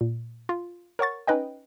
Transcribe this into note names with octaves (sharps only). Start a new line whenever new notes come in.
A#2
F4
A#4 C#5 F#5 C#6 A6
C#4 D#4 B4 D#5 G5